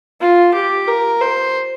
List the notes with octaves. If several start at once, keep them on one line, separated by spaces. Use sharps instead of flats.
F4
G4
A#4
C5